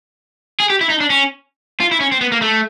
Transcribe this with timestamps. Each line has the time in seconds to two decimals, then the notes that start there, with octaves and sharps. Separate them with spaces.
0.60 G#4
0.70 G4
0.81 E4
0.90 D#4
1.00 D4
1.10 C#4
1.80 F4
1.91 E4
2.00 C#4
2.12 C4
2.21 B3
2.32 A#3
2.42 A3